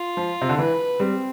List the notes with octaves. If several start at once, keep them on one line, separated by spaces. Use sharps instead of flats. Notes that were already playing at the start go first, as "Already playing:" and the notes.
Already playing: F4
F3
C3
D3
E3 B4
G3 C4